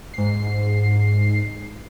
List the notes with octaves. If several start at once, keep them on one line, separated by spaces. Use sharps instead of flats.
G#2 C7